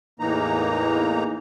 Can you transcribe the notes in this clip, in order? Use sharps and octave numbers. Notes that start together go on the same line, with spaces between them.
E2 A2 E3 A#3 D#4 A#5